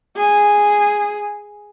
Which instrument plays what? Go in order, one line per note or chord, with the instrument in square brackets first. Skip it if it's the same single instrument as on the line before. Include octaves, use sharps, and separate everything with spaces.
[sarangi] G#4